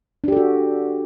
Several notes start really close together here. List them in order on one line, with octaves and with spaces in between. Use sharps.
D4 G4 A4 F#4